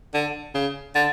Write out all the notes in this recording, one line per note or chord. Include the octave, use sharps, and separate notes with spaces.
D3
C#3
D3